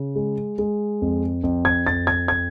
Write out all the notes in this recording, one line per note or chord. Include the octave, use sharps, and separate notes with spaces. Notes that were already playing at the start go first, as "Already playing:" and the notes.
Already playing: C#3
G#3
G#3
F2
F2
G#6
F2 A6
G#6
G#6